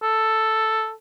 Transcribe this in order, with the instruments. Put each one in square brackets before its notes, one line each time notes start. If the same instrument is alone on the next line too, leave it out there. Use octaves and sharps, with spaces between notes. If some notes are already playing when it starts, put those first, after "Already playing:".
[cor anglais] A4